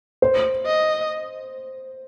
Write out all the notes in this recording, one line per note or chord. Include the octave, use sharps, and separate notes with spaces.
C5
D#5